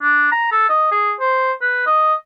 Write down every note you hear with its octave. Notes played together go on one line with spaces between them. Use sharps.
D4
A#5
A4
D#5
G#4
C5
B4
D#5